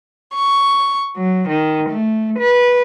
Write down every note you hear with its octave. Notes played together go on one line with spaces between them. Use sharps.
C#6
F#3
D#3
A3
B4